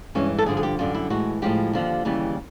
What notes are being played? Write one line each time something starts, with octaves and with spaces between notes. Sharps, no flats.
G2 E3 G#3 C#4
A4
G2 D3 F3 G#4
G#4
G4
F#2 D3 G3 F4
E4
A2 E3 G#3 F#4
A2 F3 G#3 G4
D#2 D3 F3
D#2 C#3 E3 G3